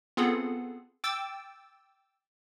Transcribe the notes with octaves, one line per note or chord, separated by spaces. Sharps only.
B3 C4 F4 G#4 A4 F#5
G5 D6 E6 A6